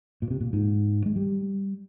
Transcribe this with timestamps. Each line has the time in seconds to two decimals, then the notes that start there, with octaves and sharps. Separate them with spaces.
0.22 A#2
0.31 C3
0.41 A#2
0.53 G#2
1.06 G#3
1.16 G3